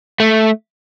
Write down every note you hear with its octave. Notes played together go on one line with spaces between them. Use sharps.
A3